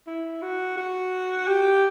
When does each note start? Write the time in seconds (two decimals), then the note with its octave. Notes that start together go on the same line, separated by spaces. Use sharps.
0.07 E4
0.42 F#4
0.77 F#4
1.47 G4